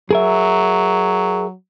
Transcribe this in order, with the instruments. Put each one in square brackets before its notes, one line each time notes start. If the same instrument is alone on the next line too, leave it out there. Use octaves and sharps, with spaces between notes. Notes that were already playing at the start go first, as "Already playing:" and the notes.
[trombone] F#3 [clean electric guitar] G#4 A#4 E5